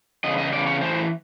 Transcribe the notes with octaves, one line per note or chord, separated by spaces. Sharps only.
E2 C#3 D#5
D#5
E2 C#3 D5
C#5
A2 E3 C5